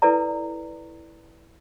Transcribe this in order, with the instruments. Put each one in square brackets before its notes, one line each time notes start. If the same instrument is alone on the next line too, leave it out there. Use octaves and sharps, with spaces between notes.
[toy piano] E4 A4 B4 D5 A#5